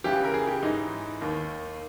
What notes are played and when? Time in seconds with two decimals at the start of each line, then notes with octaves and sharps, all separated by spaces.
0.04 C#2 C#3 E3 G4
0.24 A#4
0.34 G#4
0.47 G4
0.62 G#2 E3 D#4
1.21 D#2 D#3